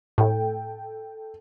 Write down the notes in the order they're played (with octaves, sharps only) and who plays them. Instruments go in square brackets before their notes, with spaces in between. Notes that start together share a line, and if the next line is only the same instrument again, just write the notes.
[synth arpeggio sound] A2 [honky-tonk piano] A4 G5